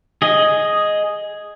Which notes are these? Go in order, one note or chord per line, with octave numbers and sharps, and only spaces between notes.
G#4 D#5